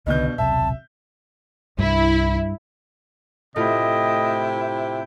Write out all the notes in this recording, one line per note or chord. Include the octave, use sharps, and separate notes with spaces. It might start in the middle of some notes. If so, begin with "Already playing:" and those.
C2 G2 B2 D3 D#3 D#5 G6
D#1 B1 C3 E5 A5
C2 G2 E4
A2 C3 A3 E4 F4 D#5 G5